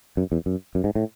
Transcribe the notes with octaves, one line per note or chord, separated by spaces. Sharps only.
F#2
E2
F#2
F#2
G#2
A2